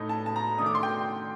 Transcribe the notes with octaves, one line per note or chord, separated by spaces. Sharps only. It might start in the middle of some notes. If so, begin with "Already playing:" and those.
Already playing: A2 A3 D#4
A5
A5
A#5
D#3 A3 D4 D#6
D6
C6
G5